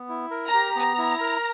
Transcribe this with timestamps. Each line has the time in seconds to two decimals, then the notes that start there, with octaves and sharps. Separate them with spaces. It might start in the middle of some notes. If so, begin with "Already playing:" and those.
Already playing: B3
0.09 E4
0.31 A#4
0.46 A#5
0.54 G4
0.76 B3 A#5
0.98 E4
1.20 A#4